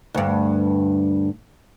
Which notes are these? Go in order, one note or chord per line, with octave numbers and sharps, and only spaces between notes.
D2 G2